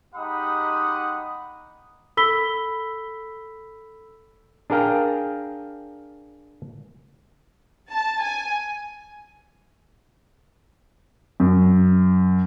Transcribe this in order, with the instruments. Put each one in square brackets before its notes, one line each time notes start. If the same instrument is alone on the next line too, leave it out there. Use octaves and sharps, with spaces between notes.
[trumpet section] G#3 D#4 G4 F#5 B5 D#6
[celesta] A4 B5 E6 B6 G7
[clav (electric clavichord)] D4 G#4 A#4 F5 G5 A#5
[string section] A5
G#5
[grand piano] F#2